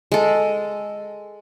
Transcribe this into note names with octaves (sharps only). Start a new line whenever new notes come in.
G#3 A4